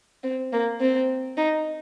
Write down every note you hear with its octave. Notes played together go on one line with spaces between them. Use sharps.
C4
A#3
C4
D#4